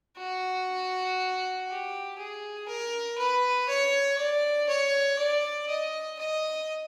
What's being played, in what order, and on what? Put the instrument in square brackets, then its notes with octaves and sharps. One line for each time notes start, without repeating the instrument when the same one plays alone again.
[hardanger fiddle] F#4
G4
G#4
A#4
B4
C#5
D5
C#5
D5
D#5
D#5